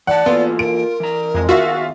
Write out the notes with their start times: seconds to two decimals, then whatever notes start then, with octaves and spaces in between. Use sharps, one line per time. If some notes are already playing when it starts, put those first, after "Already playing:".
0.07 E3 D5 F#5 A5
0.26 E3 A#3 B3 F4 A4
0.59 A#4 D7
1.00 E3 A#5
1.34 F2 G#3
1.49 D#3 B3 F4 F#4 G#4 E5 F5